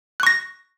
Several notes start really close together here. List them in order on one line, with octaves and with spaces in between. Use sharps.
F#6 C#6 A#6